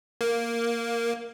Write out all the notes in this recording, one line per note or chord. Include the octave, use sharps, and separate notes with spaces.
A#3